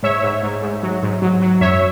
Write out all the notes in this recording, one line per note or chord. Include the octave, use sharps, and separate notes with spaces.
G#2 C#5 E5
G#2
G#2
G#2
F#3
G#2
F#3
F#3
F#2 C#5 E5